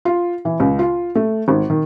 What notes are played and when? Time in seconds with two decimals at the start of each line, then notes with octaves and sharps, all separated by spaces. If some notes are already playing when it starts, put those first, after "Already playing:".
0.05 F4
0.45 E3
0.60 C#2
0.79 F4
1.15 A3
1.48 G#1
1.70 D#3